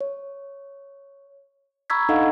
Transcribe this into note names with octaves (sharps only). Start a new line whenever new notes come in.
C#5
A#5 B5 C#6 E6 G#6 B6
D4 D#4 A4 D#5 F5 F#5